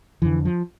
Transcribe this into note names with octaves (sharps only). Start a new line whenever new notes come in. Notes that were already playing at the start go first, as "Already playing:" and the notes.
F2 D3 E3
F3